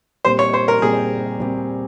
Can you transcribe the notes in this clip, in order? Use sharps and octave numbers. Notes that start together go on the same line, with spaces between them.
A#2 G3 C4 G4 C5
C#5
C5
A#4
A#2 G3 C4 G4 G#4
A#2 G3 C4 G4